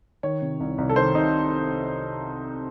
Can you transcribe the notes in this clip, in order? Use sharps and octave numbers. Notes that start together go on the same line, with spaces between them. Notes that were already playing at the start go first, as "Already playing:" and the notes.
D#3 C#5
C3
C2
C2
A4
D#3 C5
C3 D#4